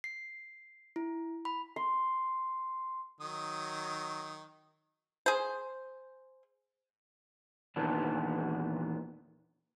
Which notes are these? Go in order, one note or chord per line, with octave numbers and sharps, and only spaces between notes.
C7
E4
B5
C6
D#3 F#3 D#6
G#4 C5
E2 A#2 D#3 E3 B3 D4